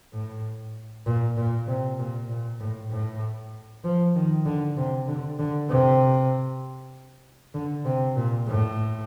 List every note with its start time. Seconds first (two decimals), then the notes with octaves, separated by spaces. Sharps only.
0.13 A2
1.06 A#2
1.37 A#2
1.68 C3
1.99 A#2
2.30 A#2
2.60 A2
2.91 A2
3.84 F3
4.15 D#3
4.46 D3
4.77 C3
5.08 D3
5.39 D3
5.70 C3
7.55 D3
7.85 C3
8.17 A#2
8.47 A2